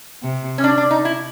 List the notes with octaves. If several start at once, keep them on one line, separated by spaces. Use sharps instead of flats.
C3
C#4
D4
D4
D#4
E4